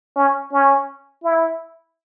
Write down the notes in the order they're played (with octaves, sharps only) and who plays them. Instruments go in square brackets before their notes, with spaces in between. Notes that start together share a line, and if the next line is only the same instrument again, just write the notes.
[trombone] C#4
C#4
E4